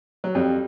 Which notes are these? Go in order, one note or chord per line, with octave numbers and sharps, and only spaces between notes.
F#3
F2 G3